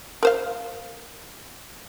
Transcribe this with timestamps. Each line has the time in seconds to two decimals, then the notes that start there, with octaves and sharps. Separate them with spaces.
0.23 A#4 C5 F5